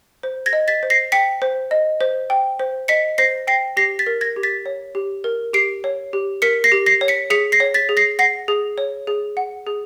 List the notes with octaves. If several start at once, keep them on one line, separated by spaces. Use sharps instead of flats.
C5
G#6 A#6
D#5
A6 B6
C5
A#6 C7
G5 B6 C#7
C5
D#5
C5
G5
C5
D#5 B6 C#7
C5 A#6 C7
G5 A#6 C7
G4 A#6 C7
A6 B6
A#4
G#6 A#6
G4
A6 B6
C#5
G4
A#4
G4 C7 D7
C#5
G4
A#4 B6 C#7
A#6 C7
G4
A#6 C7
C#5
B6 C#7
G#4 B6 C#7
A#6 C7
C#5
A6 B6
G#4
A#6 C7
F#5 A#6 C7
G#4
C#5
G#4
F#5
G#4